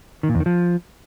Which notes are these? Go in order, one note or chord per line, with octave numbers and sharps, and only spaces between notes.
D#3
A#2
E2
D#3
F3